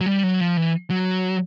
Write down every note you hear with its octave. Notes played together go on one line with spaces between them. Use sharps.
F#3
G3
F#3
F3
E3
F#3